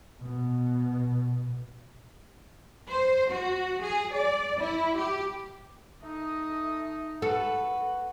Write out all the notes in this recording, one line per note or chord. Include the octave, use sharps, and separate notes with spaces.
B2
C5
F#4
G#4
D5
E4
G4
A3 D#4 D#5
F#4 A4 B4